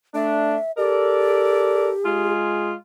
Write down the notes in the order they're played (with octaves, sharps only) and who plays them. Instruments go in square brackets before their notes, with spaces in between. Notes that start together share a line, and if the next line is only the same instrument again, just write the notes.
[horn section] A3 D4 [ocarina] E5
[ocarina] G4 [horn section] A4 A#4 D5
[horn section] G#3 F4 G#4